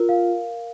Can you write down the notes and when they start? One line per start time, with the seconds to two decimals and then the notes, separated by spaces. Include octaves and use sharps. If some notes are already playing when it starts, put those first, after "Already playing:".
Already playing: F4 A#4
0.09 F5